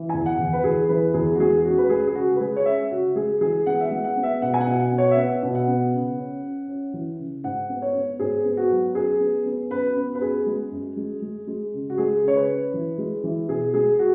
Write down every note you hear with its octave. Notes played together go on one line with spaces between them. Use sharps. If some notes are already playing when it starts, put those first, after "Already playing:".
Already playing: E3
E2 G#5
F#5
E2
B4
E2 G#4
E3 B4
E2 G#4
F#4
G#3 G#4
C#4 F#4
B4
G#3 G#4
G#4
C#3 F#4
B4
G#3 G#4
C#5
C#4 E5
C#3 F#4
G#3 G#4
E3 G#4
B3 F#5
E5
F#5
G#3
F#5
B3
E5
B2 F#5
G#5
F#5
B2
F#5
B3
C#5
E5
B3 F#5
B2
F#5
B3
C#3
C#4
C#4
C#4
E3
C#3
G#2 F#5
B3
C#5
B3
G#2 G#4
B3
F#4
F#3
F#2 G#4
B3
B3
F#2 B4
B3
B4
F#2 G#4
G#3
F#2
G#3
G#3
G#3
C#3
F#4
G#3 G#4
C#3 C#5
B4
C#4
E3
G#3
E3
B2 G#4
G#3 G#4
F#4